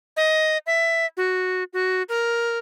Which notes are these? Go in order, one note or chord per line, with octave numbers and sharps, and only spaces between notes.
D#5
E5
F#4
F#4
A#4